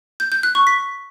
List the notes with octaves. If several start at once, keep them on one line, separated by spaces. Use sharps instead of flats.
G6
G6
F#6
C#6
B6